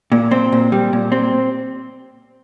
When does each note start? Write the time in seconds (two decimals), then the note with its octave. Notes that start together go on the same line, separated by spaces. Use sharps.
0.12 A#2
0.31 C4
0.52 A#2
0.72 G3
0.93 A#2
1.12 C4